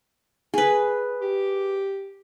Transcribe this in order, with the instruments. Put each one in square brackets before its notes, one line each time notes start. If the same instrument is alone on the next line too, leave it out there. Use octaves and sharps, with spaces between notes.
[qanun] G#4 B4
[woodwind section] G4